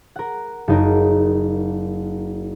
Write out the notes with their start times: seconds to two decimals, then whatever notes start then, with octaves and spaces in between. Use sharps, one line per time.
0.16 A#4 F#5
0.68 F#1 D#4 A#4